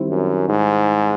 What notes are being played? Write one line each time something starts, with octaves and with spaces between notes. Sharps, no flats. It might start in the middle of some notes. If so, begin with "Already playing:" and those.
Already playing: D#3 G3 C4 E4
F#2
G#2